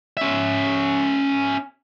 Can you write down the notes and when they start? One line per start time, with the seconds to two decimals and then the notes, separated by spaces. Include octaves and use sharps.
0.17 C#4 E5